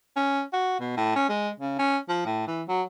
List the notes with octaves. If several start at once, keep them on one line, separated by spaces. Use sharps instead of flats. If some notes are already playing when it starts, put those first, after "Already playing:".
C#4
F#4
B2
A2
C#4
G#3
C#3
C#4
F3
A2
E3
F#3